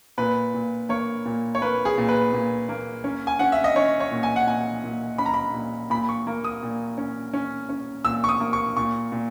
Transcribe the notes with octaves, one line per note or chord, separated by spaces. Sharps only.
A#2 B4
A#2
A#3 C#5
A#2
C#5
A#3 B4
G#4
A#2
B4
A#2
A#3
C#4
G#5
C#4 F#5
E5
D#5
C#4 C#5
C#5
A#2
G#5
F#5
A#2 G#5
A#2
C#4 B5
A#5
B5
A#2
A#2 B5
C#6
A#3
D#6
A#2
C#4
C#4
C#4
A#2 E6
C#6
D#6
A#3
C#6
A#2 C#6
A#2